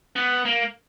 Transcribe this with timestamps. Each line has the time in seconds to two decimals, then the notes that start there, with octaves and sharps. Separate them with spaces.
0.16 B3
0.45 A#3